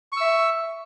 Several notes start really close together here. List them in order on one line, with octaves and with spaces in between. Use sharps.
C#6 E6 E5